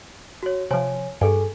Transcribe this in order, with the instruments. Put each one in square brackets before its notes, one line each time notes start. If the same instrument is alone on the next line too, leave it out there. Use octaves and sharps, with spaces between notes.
[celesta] F#4 C#5
[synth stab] C3 F3 [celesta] C#5 G#5
[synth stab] G2 [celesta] G#4 A4 G#5